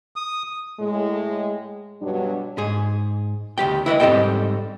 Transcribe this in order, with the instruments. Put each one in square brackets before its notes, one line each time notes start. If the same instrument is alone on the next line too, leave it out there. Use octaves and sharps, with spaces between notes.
[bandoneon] D#6
[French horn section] A2 G#3
G2 B2 F#3 G3 D4
[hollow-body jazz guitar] G#2 G#4
D2 F#3 G4 G5
E4 B4 C5 D#5
G#2 G3 C4 A4 D#5 G5